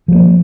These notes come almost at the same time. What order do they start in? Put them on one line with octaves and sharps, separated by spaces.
F3 G3 A#3